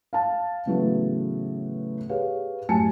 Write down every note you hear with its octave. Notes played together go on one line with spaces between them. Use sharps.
F5 A5
A2 C#3 E3 F#3 A3 B3
G4 G#4 B4 C#5 F5
F#2 A2 G4 G#5 A5 C#7